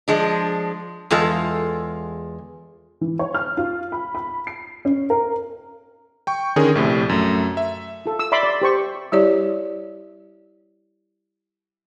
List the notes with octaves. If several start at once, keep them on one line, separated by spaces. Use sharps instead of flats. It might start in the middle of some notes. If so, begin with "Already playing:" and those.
F3 G#3 D4
E2 G#3 F4 A4
E3
C#5
F6
F4
B5
B5
C7
C#4
A#4
G5 C#6
D3 D#3 C#4 G#4 A#4
A#1 A2 C3
F#2 A3
E5
F4 A4
E6
D5 E5 B5 C6 D6
D5
G4 C5 C#6
G3 E4 G4 C#5 D5